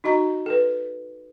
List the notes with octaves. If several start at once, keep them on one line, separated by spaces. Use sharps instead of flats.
D#4 F#4 D#5 A#5
A4 B4